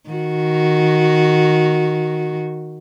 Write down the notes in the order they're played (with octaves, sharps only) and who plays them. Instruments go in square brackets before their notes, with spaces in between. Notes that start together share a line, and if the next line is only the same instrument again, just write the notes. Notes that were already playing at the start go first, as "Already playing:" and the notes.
[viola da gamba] D#3 F#4